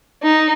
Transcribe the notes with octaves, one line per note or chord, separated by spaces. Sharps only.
D#4